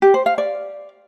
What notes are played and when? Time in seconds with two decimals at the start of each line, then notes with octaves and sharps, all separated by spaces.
0.02 G4
0.14 C5
0.26 F5
0.38 D5